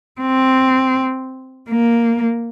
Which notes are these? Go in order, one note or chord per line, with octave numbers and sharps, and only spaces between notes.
C4
A#3